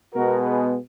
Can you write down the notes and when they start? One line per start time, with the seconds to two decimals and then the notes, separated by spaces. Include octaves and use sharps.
0.13 B2 G#3 B3 F#4 A#4
0.44 G#4 B4